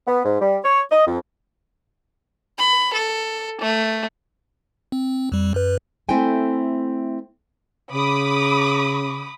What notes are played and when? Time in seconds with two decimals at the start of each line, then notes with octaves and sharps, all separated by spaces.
0.07 B3
0.25 G#2
0.41 G3
0.64 C#5
0.91 D#5
1.06 F2
2.58 B5
2.93 A4
3.61 A3
4.92 C4
5.17 C4
5.32 F2 G3
5.54 F#2 B4
6.09 A3 C4 E4 A4 G5 G#5
7.92 C#3 B5 D6 D#6